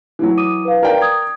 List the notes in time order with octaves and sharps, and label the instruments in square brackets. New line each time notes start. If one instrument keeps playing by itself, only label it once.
[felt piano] E3 F#3
[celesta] D6 D#6 D#7
B4 F5
[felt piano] A#4 D5 G5
[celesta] D#6 G#6